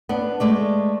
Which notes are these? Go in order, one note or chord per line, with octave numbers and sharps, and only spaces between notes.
B3 D4
G#3 A3 D5